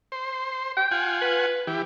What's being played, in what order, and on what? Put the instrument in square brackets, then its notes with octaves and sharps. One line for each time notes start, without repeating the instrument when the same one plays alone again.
[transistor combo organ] C5
[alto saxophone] G5
[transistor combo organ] F4 F#5 G#5
[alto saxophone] B4
[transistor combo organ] E3 G4